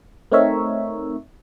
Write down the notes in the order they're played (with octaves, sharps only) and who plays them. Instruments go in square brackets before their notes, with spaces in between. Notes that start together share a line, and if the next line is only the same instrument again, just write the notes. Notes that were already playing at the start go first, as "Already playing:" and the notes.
[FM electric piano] A3 C4 D#4 A#4 C#5 E5